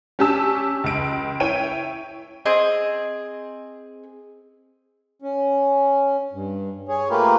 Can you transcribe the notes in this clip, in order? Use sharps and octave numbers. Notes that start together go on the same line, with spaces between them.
C#4 D4 G4 G#5 A5 E6
C#2 D7
E4 C#5 G5 D#7
C4 G#4 D#5
C#4
G2
G#4 C#5
A3 A#3 F4 G4 A#4 B4